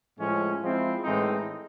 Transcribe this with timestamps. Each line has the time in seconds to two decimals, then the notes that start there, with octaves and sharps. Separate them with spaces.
0.19 A2 F3 G#3 C#4
0.61 F3 G#3 C4 E4
1.03 A2 E3 G#3 C4 D#4